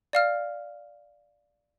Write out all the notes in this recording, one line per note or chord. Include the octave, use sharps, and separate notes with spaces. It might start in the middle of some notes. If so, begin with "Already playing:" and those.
D5 F5 F6